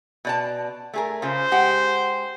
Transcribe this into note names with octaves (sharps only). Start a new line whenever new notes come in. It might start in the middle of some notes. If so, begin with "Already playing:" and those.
B2 D5 A5
A3 G#4 A#4
C#3 F4 C5
G#3 G4 F#5